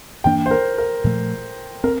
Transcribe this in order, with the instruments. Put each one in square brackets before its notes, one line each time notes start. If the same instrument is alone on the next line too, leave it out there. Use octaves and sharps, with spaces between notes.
[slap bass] G2 E3 A#3 D4 [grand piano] G5
[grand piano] C5
A#4
A#4
[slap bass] A#2 F3 A3
[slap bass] C4 [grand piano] A#4